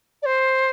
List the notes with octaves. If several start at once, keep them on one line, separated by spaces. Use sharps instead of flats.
D5
C5